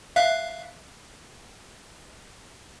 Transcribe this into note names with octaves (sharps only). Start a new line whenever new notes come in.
E5 F5 F#6